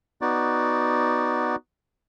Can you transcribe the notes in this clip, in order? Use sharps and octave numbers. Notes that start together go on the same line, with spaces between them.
B3 D#4 F#4 D5